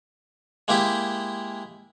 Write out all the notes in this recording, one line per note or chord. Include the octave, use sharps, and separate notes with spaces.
G#3 A#3 E4 G4